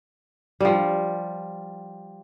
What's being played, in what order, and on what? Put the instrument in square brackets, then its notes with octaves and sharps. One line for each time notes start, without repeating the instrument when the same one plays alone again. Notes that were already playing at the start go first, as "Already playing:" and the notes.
[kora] F3 G3